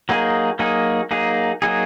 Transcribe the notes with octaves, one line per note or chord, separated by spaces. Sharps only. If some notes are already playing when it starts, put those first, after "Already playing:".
F#3 A#3 D#4 G#4
F#3 A#3 D#4 G#4
F#3 A#3 D#4 G#4
F#3 A#3 D#4 G#4